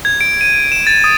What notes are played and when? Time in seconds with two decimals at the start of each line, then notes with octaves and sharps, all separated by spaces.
0.05 G#6
0.21 D7
0.41 D#7
0.72 E7
0.87 A6
1.04 D#6